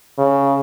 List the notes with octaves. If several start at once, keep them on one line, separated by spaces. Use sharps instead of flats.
C#3